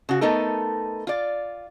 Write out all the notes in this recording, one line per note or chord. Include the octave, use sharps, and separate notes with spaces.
C#3 F#4
A3 B3 D#4 A4 A#4
F4 D5